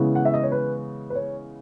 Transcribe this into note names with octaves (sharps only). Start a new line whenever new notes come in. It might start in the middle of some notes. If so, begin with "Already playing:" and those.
Already playing: C#3 E3 G#3 B3 E4
F#5
E5
D#5
C#5
B4
B4
C#5